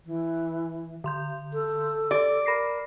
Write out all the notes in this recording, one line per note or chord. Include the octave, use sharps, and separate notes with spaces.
E3
D3 C6 G6
A4
G4 D5
A#4 B5 A#6 C7